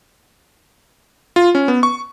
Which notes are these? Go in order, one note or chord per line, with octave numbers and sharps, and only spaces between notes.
F4
C#4
B3
C#6